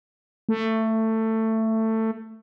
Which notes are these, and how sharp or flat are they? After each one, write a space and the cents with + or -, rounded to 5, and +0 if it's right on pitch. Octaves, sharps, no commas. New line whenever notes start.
A3 +15